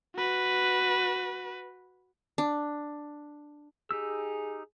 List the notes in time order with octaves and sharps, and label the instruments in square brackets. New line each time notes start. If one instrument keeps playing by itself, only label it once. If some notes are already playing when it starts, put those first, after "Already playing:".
[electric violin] F#4 B4
[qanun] D4
[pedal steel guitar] D#4 G4 E6 [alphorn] G#4